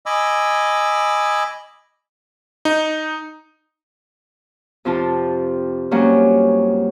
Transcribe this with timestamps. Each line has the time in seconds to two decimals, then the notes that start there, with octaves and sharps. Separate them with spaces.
0.06 D#5 G#5 B5 D6 E6
2.65 D#4
4.85 F2 C3 F3 F4 A5
5.91 F2 F#3 G3 A#3 C#4